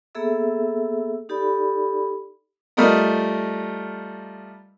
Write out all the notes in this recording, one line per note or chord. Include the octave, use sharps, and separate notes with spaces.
A#3 B3 G#4 A4 E5 E6
D#4 G4 A4 D5 B5
G3 A3 F4 A#4 D#5